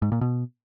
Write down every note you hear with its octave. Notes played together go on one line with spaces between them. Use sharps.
G#2
A#2
B2